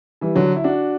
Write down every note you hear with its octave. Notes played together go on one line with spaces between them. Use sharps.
E3 G3
D3 F#3
E4
D4 F#4